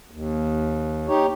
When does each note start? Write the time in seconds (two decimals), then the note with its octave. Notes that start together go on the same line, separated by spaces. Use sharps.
0.11 D#2
1.08 D#4 G4 C#5